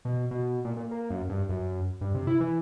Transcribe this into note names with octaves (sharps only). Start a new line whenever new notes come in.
B2
B2
A#2
A#2
A#3
F#2
G2
F#2
G2
C3
E4
E3